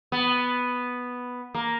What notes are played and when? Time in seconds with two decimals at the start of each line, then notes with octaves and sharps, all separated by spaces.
0.12 B3
1.54 A#3